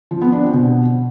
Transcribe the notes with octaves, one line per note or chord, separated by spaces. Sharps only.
F3
B3
D4
C4
B2